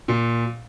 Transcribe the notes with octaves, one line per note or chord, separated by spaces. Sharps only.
A#2